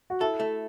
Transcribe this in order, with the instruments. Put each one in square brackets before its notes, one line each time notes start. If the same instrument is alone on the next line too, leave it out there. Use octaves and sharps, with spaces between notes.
[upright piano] F#4
[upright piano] E4 [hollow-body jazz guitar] A4
[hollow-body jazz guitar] A3